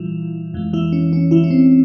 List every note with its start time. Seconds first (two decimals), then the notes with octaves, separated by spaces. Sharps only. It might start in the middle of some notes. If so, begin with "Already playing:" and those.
Already playing: A#2 E3 G3 E4 F4
0.54 F2 E3 G#3
0.73 E3 E4
0.92 C#4
1.13 C#4
1.31 E3 E4
1.44 C#4
1.51 C4